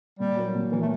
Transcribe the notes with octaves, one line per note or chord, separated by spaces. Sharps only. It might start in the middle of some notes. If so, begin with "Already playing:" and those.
A#2 G3
F#3 A#3
A#2
E3 F#3 A#3
A3